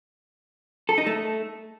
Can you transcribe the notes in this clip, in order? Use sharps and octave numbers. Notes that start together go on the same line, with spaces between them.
A4
D#4
A3